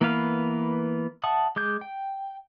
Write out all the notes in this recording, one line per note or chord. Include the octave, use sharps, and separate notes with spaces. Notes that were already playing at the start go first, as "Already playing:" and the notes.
E3 A#3 B3 B4 F5
E5 F#5 A5 D#6
G#3 D6 G6
G5